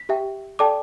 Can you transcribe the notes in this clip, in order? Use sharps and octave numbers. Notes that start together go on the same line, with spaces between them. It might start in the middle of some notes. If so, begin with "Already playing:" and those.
Already playing: B6
G4 E5 G5
A4 D5 G5 A5 D6